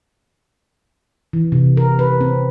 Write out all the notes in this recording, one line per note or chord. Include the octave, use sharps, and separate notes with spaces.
E3
C3
A#4
B4
C4